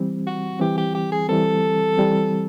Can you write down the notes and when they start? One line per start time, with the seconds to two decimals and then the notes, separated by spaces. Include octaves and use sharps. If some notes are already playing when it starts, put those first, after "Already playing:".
Already playing: E3 G3 C4
0.27 F#4
0.60 E3 G3 C4 G4
0.77 G4
0.95 G4
1.12 G#4
1.29 E3 G3 C4 A4
1.97 E3 G3 C4